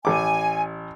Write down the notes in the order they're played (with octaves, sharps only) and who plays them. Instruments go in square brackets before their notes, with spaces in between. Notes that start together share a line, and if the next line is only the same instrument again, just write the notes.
[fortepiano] A1 D6 [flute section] G#5